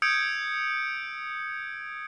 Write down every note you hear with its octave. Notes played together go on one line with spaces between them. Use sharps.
D#6 E6 G6 G#6 C#7 D7